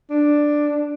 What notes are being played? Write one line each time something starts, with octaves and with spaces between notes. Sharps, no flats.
D4